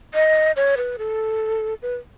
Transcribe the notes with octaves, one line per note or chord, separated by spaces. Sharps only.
D#5
C#5
B4
A4
B4